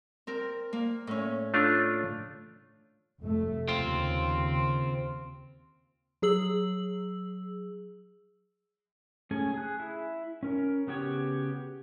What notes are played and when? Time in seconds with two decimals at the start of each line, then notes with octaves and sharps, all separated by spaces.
0.27 C4 A#4
0.73 A#3
1.07 A2 C#4
1.54 A3 D4 F4
3.22 F1 A3
3.68 D#2 C#3 C4 F4
6.22 F#3 G#4 E6 F#7
9.31 A3 C#4 G#4 G#5
9.54 G#4 F#6
9.80 E4
10.43 C#4 A#4
10.87 C#3 B3 F#4 G4 C#5